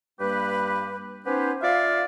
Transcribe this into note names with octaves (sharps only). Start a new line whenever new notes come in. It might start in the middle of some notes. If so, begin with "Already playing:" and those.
G2 G3 A#3 G4 B4
B3 C#4 D#4 G4 B4 C5
F4 D5 E5 F5